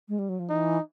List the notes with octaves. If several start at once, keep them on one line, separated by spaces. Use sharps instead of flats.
G#3
G3
F#3
F3
E3 D#4